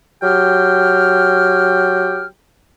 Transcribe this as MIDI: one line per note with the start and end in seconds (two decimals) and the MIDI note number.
0.22 2.26 54
0.22 2.26 67
0.22 2.26 79
0.22 2.26 89